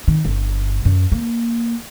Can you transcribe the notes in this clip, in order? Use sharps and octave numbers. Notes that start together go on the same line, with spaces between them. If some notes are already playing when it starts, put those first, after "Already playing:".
D#3
G1
F#2
A#3